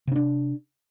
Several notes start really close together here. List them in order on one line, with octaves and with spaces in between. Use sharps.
C3 C#4 D4